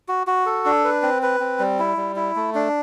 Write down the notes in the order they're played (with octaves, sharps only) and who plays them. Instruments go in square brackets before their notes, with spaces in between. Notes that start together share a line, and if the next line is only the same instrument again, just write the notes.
[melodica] F#4
F#4
A4
D4
B4
C4
B4
C4
G3
E4
G3
E4
A3
D4